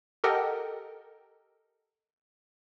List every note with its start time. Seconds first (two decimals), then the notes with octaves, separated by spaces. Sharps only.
0.24 G4 A4 A#4 D#5 F#5 G5